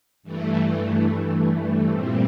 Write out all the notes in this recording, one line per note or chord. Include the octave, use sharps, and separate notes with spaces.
G2 E3 A3
A#2 G3 C4